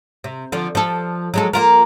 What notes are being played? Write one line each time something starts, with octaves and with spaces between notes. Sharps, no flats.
C3
D3 F3
F3 A4
F#3 G#3 A4
A#3 F4 A#4